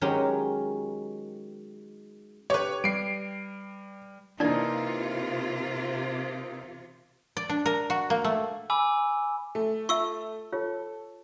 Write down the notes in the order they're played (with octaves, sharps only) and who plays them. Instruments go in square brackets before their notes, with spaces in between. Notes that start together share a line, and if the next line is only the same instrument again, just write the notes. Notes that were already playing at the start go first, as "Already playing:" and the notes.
[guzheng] D#3 F#3 G#3 C#4 G4 A#4
[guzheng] G4 B4 [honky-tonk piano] C#5
[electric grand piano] G3 [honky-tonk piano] C7 D7
[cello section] C3 F4 [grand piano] E3 A#3 D#4 [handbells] D4 D5 G#6
[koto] D5
D4
A#4
F#4
A#3
A3
[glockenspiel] G#5 B5 D6 E6
[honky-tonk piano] A3
[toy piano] F4 E5 [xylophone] C#6 E6
[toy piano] F4 G4 C#5 [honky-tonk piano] A4